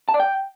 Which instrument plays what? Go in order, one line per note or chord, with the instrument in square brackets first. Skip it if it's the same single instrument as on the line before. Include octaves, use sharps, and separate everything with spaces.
[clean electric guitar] A5
D5
G5